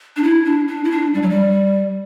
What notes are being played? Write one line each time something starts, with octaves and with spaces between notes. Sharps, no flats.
D4
E4
D4
D4
E4
D4
G3
F#3
G3